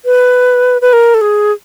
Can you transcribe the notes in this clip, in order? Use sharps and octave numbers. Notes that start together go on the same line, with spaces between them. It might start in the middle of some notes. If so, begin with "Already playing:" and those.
B4
B4
A#4
A4
G#4